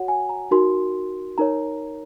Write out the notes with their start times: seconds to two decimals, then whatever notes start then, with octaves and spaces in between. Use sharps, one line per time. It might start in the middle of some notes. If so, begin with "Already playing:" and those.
Already playing: F#4 C#5 F#5
0.08 G#5
0.29 A#5
0.51 D#4 F#4 A#4 C6
1.38 D#4 A#4 C#5 A#5